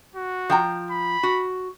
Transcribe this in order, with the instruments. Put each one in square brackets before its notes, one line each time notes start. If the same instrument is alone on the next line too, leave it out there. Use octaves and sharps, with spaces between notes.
[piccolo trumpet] F#4
[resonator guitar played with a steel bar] F3 G5 A#5
[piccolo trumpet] B5
[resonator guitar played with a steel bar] F#4